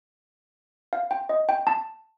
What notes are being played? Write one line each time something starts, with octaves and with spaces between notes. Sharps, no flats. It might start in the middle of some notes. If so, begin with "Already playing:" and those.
F5
G5
D#5
G5
A5